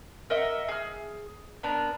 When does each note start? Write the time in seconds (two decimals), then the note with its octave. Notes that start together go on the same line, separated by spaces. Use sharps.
0.30 A#4 D#5 E5 F#5
0.68 G#4 F6
1.63 B3 D4 A#4